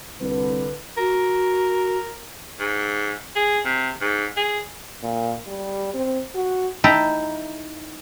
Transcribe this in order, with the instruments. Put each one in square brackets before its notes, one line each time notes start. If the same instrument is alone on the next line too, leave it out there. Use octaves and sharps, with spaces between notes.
[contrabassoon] C2 [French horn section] D3 B4
[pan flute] F#4 [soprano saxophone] A#4
[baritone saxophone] G#2
G#4
C3
G#2
G#4
[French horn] A#2
G3
C4
F#4
[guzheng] D#4 E4 E5 G5 A5 A#5